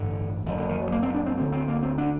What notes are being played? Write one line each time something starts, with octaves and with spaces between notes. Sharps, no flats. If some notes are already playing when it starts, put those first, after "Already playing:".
Already playing: A1 G2 D3
F#1 F#2 D3
D3
D#3
F#3
A#3
C4
D4
C4
D2 D3 C4
C4
A#3
C4
D4